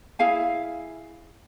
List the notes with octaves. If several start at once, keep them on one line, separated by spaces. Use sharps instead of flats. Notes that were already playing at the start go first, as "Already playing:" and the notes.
E4 G#4 F5 G#5